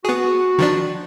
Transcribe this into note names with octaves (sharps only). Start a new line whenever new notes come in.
B3 F#4 G#4
D#3 F3 D4